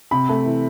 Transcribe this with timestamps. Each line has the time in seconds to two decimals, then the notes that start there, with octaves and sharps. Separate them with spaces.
0.11 C3 B5
0.29 A3
0.46 E3